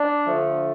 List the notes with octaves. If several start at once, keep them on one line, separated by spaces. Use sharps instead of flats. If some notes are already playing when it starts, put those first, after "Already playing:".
Already playing: D4
D3 F3 A3